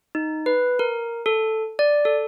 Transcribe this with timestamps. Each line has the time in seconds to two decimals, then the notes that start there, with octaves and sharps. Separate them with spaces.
0.15 D#4
0.46 B4
0.79 A#4
1.26 A4
1.79 D5
2.05 A4